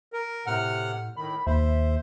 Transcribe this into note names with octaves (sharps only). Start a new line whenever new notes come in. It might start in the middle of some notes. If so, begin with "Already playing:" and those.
A#4
A2 C3 F#5 F6
A2 D#3 B5
D#2 C5 E5